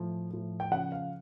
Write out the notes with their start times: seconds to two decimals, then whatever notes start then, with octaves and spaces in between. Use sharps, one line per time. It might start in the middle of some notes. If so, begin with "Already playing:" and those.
Already playing: A2 F3
0.31 A2 F3
0.60 G5
0.71 C#3 F3 F#5
0.92 F5